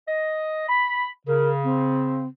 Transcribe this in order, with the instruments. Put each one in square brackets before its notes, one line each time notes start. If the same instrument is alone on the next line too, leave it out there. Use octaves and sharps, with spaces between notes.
[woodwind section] D#5
B5
[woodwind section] C#3 [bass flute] A#4
[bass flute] C4